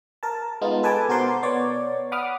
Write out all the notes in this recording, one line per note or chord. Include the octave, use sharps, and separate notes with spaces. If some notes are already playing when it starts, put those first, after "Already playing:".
A#4 A5
G#3 B3 D#4 F4
A4 B4 G#5 A5 D6
B2 F#4 A#4 C5 C6 D6
B3 C#5 D5
F#5 B5 D6 D#6 F6